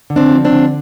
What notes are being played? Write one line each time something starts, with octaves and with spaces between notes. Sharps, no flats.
D3
C4 D4
F3
C4 D4
D3